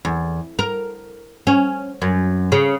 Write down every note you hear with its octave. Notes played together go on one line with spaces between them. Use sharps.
E2
A#4
C#4
F#2
C#3